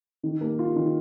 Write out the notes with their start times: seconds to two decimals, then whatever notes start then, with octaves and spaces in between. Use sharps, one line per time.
0.23 D#3
0.41 A#3
0.59 F4
0.76 D#3